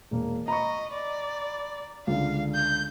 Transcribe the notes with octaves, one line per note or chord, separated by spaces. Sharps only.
E1 A#3
D#5 A#5 B5 C#6
D5
C#2 D3 F5
G6